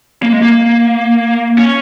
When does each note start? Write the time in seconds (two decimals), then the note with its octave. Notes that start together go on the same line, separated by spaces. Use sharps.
0.23 A#3
0.33 G#3
0.42 A#3
1.58 C#4